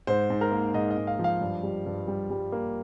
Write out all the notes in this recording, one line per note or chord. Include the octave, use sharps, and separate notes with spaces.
G#2 C5
G#2
A#4
A#3
G#2 D#5
D#5
G#2
F5
F3
F5
G2
G3
G2
G3
G3
A#3